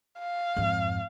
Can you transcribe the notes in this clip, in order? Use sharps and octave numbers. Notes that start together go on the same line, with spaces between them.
F5
F2 G#2